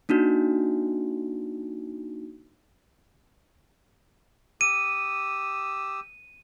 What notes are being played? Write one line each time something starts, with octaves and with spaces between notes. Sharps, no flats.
A#3 D4 D#4 F#4
G4 D#6 E6 D#7